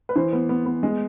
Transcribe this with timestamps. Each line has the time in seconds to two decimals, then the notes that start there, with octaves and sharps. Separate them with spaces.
0.09 B4
0.16 E3 C5
0.33 B3
0.49 B3
0.66 B3
0.83 G#3